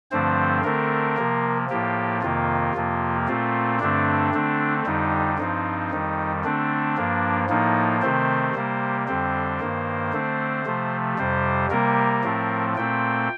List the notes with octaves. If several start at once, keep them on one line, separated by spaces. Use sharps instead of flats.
G2 D3 F3 A3 C4 C5
D3 A3 C4 A#4
C3 F3 A#3
A2 F3 A#3 G4
F2 C3 D#3 A#3 F4
F2 C3 F3 A#3
A#2 A3 C4 F4
G2 D3 A3 C4 D4
D3 A3 C4
F2 D3 G3 D#4
G2 F3 C4 D#4
F2 D#3 G3
D3 A3 C4 D4
G2 F3 A#3
A2 F3 A#3 D#4
C3 D#3 A3 C4 C5
C3 G3 A#3
F2 D3 G3 C4 C5
G2 D#3 A#3
D3 A3 C4
C3 F3 A3
F2 C3 G3 C5
C3 G3 A#3 A#4
A2 F3 A3 C4
A#2 A3 C4 G5